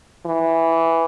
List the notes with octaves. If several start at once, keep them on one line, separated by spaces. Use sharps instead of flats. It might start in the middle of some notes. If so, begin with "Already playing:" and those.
E3